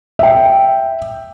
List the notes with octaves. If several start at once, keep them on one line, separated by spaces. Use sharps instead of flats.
E5 G5